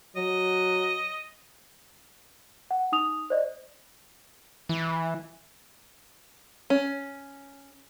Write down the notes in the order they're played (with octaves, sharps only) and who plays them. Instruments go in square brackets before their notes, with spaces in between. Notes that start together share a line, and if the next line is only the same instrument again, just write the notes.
[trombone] F#3 [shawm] D#5
[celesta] F#5
D#4 D#6 F7
C5 D5 D#5
[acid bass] E3
[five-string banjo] C#4